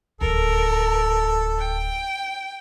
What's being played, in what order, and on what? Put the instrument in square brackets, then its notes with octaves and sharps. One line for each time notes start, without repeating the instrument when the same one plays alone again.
[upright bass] D1 D#2 [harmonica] A4 [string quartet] A#4
[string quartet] G5